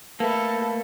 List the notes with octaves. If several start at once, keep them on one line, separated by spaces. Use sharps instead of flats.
A3 A#3 A4 B4 B5